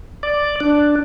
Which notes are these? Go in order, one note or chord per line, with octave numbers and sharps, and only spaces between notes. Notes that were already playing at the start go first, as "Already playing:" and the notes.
D5
D4